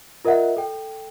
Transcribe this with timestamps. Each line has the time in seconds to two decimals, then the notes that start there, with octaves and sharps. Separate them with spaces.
0.25 F4 A#4 D#5 E5 F#5
0.57 A4 G5